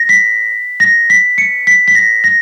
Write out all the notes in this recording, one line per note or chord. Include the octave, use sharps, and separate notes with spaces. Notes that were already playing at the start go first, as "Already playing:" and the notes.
Already playing: A#6
B6
A#6
B6
C#7
B6
B6
A#6
A#6